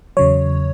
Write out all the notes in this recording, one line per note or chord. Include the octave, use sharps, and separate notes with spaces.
E2 C#3 F#3 C#5